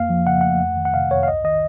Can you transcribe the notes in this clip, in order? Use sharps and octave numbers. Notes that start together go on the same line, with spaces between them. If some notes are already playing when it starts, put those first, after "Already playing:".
Already playing: F2 A#3 F5
F3
C#3 F#5
A3 F#5
F2
D#3
F#5
C3 F5
F2 C#5
F5
C2 D#5
D#3 D#5